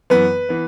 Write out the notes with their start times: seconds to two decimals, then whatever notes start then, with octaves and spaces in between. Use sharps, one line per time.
0.10 F#2 E3 B3 B4
0.49 E3 B3